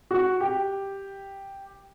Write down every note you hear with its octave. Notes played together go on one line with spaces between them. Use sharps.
F#4
G4